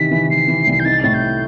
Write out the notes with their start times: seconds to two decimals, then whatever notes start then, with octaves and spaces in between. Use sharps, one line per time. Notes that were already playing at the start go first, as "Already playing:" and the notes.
Already playing: C3 D#3 E3 B6
0.11 E3
0.29 E3 C7
0.48 E3
0.67 C2
0.80 G6
0.85 D#4 A6
1.03 A2 A6
1.14 G6